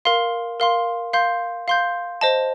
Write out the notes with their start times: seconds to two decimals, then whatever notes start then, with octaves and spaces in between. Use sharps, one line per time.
0.05 A#4 F5 C6
0.60 A#4 F5 C6
1.13 F5 C6 G6
1.68 F5 C6 G6
2.21 C5 D#5 A5